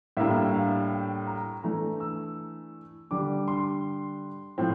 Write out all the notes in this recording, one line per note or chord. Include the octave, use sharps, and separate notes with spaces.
A2 G3 A#3 D4 E5
F5
G5
A#5
E3 A3 D4 A#5
E6
D3 G3 D4 D6
C6
A2 F3 C4